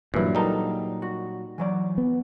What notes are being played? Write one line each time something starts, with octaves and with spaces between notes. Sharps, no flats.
G2 A#2 E3 F#3 D4 E4 B4
G3 D#4 A4 A#4 A5
F#4
E3 F#3 D5
B3